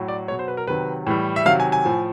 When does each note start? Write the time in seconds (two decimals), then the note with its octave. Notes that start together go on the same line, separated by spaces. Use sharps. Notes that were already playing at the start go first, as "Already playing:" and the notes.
Already playing: A2 F#3
0.08 D5
0.28 B2 F#3 C#5
0.39 C5
0.48 B4
0.57 A#4
0.67 C3 D#3 F#3 B4
1.07 A2 E3 G3
1.36 E5
1.45 C3 D#3 F#3 F5
1.60 G#5
1.72 G#5
1.85 A2 F3